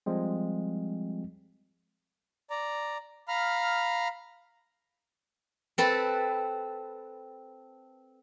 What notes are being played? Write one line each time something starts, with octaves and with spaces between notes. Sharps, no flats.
F3 G3 G#3 C4
D5 A#5
F5 A#5 B5 F6
C4 A4 B4